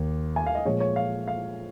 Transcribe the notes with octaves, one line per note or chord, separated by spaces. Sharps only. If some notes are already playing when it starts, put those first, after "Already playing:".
Already playing: D#2 A#3
G#5
F5
D#5
A#2 F3 G#3 C#5
C#5
F5
F5